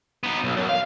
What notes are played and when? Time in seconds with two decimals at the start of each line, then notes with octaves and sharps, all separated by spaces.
0.23 B3 D#4
0.44 B1
0.56 F#2
0.69 F5